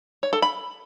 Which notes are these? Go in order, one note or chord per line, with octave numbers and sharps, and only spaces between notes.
C#5
A4
B5